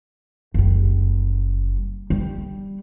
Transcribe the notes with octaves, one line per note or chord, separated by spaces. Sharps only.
F#1 G3
G3